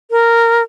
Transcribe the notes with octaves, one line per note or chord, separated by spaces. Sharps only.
A#4